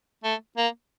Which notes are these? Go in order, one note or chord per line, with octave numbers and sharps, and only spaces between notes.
A3
A#3